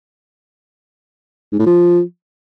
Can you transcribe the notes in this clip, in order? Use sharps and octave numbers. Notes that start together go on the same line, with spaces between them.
G#2
A2
F3